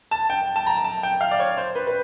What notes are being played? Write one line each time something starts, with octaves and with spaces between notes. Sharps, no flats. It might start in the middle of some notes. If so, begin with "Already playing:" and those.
A5
G5
A5
A#5
A5
G5
F5
D5
C#5
C5
B4
B4